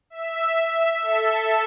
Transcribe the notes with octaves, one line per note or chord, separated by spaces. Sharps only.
E5
E5
A4